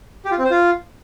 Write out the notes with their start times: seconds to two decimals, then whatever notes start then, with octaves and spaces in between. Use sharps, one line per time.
0.25 G4
0.31 F4
0.38 C4
0.44 C5
0.51 F4